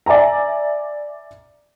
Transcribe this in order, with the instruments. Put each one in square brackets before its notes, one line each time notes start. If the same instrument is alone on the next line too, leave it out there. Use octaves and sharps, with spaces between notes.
[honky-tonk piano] D5 E5 G#5 A#5